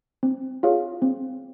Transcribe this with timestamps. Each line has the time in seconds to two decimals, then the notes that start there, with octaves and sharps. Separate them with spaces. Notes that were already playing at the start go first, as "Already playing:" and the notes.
0.23 C4
0.63 F4 G#4 C#5 F5
1.02 C4